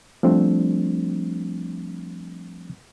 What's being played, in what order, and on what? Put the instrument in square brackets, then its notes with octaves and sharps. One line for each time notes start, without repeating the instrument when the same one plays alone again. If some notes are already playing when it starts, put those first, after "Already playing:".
[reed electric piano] F3 G3 A3 C4 D4